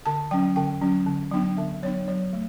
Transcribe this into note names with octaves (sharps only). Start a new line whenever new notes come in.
D3 A5
F#3 C#4 G5
D3 G5
F#3 C#4
D3
F#3 B3 D4
D3 E5
F#3 B3 D4 C#5
F#3 C#5
A3